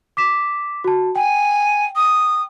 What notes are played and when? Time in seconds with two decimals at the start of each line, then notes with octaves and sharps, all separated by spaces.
0.17 D6 B6 E7
0.84 F#4 A5
1.16 G5 G#5
1.96 D#6